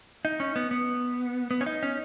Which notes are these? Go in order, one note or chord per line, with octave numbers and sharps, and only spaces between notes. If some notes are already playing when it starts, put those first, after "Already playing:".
D#4
C#4
B3
B3
B3
C#4
D#4
C#4